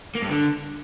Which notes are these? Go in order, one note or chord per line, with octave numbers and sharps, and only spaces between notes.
A#3
G2
D3